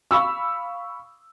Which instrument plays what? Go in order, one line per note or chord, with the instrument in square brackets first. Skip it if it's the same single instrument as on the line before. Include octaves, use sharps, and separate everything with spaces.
[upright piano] F5 B5 C#6 E6